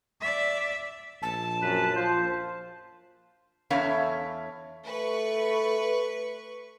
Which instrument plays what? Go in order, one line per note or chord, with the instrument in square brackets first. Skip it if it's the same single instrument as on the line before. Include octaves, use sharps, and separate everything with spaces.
[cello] D5 E5
[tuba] A#1 [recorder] A5
[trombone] F#2 [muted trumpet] B4
[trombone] F3 [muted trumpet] C5
[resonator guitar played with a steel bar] E2 C#4 E4 A4 C#5 F5
[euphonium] A3 [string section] B4 C#6